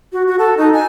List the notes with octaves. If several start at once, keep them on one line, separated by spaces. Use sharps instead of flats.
F#4
F#4
A4
D#4
G#5